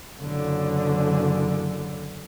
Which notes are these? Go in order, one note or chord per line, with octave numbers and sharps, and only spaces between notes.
F#1 D3